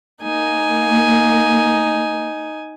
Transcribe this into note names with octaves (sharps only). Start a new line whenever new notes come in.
A#3 D#4 G#5